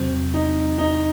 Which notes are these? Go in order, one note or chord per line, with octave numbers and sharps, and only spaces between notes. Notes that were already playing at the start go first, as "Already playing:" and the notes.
Already playing: E2 C3 F#3 C4
D#4
D#4